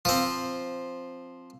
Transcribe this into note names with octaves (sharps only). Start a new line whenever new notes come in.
F3 C4